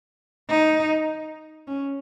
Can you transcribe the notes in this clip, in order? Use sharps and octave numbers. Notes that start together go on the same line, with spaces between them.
D#4
C#4